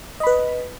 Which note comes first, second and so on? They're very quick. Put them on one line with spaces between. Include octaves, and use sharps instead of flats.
D#5 B5 B4